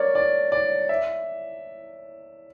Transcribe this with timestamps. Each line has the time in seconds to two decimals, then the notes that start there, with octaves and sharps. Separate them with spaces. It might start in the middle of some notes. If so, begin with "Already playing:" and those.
Already playing: A#4 C#5 D5
0.15 D5
0.52 D5
0.89 E5